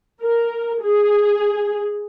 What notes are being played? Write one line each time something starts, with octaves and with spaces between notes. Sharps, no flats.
A#4
G#4